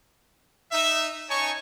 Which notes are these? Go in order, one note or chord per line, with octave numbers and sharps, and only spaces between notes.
D#4 E5
C#4 D#4 C#5 G#5 A5 C#6